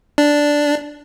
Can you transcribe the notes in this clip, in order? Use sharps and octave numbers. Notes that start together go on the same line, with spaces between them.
D4